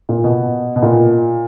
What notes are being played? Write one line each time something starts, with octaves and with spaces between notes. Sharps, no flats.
A#2
B2
B2
A#2